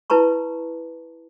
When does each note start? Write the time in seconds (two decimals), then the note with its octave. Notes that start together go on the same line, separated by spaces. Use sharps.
0.10 E4 B4 A5 A#5 C#6